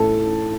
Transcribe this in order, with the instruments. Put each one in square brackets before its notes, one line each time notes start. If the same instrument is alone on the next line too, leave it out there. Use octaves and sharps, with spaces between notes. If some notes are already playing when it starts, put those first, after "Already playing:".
Already playing: [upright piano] A2 E3 A4 A5